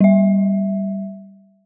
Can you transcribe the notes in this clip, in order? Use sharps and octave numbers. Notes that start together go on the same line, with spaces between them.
G3 E5